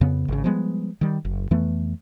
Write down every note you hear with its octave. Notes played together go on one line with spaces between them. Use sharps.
F2 C#3 B3
G#1 C#3
F3 G3 G#3 B3
D#3 G3
F#1
F2 E3 A3 B3